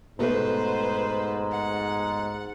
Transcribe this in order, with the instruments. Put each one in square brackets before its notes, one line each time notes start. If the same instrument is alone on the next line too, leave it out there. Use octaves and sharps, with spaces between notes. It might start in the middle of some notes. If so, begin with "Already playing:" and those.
[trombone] G#2 [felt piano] B2 A3 [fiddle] B4 C5
[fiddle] F#5